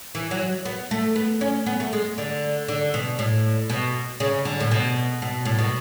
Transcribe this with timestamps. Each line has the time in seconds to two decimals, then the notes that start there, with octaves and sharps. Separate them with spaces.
0.15 E3
0.31 F#3
0.65 B3
0.91 A3
1.16 B3
1.41 C#4
1.66 B3
1.80 A3
1.93 G#3
2.18 D3
2.68 D3
2.94 B2
3.19 A2
3.70 B2
4.20 C#3
4.45 D3
4.60 A2
4.71 B2
5.22 B2
5.45 A2
5.58 B2